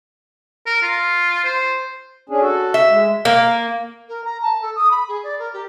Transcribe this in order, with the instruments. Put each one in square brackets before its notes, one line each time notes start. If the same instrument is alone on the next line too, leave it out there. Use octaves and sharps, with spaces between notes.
[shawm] A#4
F4
C5
[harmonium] C#4 D4 G#4
F#4 A4
[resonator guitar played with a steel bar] E5
[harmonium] G#3
[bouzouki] A#3
[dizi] A#4
A#5
A5
A4
D#6
B5
G#4
D5
A#4
G4